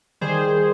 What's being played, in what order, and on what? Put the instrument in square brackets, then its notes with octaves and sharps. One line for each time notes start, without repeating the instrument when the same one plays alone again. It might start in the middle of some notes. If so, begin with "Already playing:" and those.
[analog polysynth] D#3 G3 G#4 C5